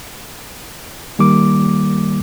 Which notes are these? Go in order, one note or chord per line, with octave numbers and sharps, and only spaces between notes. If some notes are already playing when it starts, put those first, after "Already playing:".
D#3 G3 A#3 D6